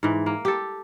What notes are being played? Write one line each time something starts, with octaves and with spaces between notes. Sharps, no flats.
G#2 E3
A#3
G4 A4